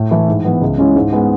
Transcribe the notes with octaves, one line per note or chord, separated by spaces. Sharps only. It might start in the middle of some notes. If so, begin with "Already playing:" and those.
Already playing: A2
E3 A3 E4
G#2
E3 B3
C#2
C#3 G#3 C#4 E4
G#2
G#3 B3